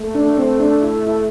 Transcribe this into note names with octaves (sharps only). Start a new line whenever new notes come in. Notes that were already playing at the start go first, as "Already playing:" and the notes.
Already playing: A3
D4
C4
D4
E4
E4